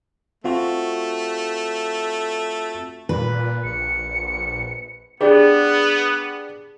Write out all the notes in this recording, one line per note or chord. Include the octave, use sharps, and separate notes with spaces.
A3 C4 F4 F#4
A#2 B4
A#1 C#7
B3 D4 G4 G#4